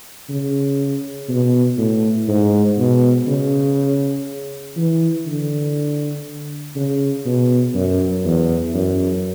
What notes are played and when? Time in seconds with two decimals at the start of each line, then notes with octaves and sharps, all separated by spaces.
0.30 C#3
1.29 B2
1.78 A2
2.28 G#2
2.78 B2
3.28 C#3
4.76 E3
5.27 D3
6.76 C#3
7.26 B2
7.75 F#2
8.25 E2
8.74 F#2